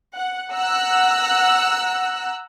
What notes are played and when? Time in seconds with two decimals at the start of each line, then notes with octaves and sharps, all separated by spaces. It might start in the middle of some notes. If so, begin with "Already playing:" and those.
0.16 F#5
0.51 F#5 A#5 E6 F#6